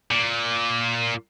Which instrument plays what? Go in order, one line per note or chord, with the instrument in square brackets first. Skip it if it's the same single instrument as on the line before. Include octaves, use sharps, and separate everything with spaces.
[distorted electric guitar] A#2